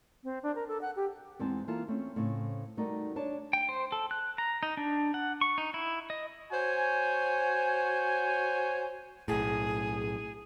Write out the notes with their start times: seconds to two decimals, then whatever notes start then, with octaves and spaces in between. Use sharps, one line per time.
0.24 C4
0.43 D4
0.55 A#4
0.68 A4
0.81 F#5
0.96 G4
1.39 E2 G#3 C4 D#4 G#5 A5
1.67 E3 A#3 F4 A4 A5
1.88 A3 C4 C#4
2.16 A2 C#3 C4
2.77 G3 A3 D#4 F#4 A#4 D5
3.16 D4 C#5 A5
3.53 G5
3.69 C5
3.92 A4
4.11 F#6
4.38 A#5
4.63 D#4
4.77 D4
5.14 F#5
5.41 C#6
5.58 D#4
5.74 E4
6.10 D#5
6.51 F#4 C5 C#5 G#5
9.28 B1 A2 G#4